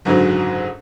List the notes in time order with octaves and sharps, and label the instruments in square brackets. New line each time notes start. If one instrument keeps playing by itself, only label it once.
[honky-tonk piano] F#1 G#2 D3 F#3